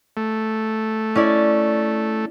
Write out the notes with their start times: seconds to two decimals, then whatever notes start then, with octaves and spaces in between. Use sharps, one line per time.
0.17 A3
1.15 C#4 E4 D5